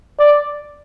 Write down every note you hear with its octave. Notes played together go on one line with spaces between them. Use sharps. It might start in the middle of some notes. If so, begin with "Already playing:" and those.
D5